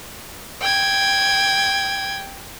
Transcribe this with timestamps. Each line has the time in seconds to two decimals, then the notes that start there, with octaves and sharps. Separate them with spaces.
0.61 G5 G#6